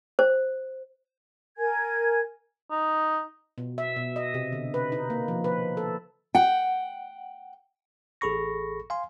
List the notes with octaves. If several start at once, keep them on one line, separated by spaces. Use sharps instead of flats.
C5
A#4 G#5 G#6
D#4
B2
E5
B2
D#5
C3
D3
B4
D#4
A#3
F3
B4
A4
F#5 G5
A1 G#4 A4 B5 C#6 A#6
F5 G#5 C6